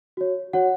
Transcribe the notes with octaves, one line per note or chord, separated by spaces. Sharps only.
F#4 C#5
F#4 C#5 F#5